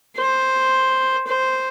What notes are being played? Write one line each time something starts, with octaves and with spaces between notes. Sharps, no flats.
C5
C5